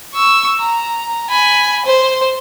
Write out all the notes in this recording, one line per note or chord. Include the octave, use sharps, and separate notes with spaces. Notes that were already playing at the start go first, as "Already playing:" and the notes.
C#6 E6
A#5
G#5 B5
C5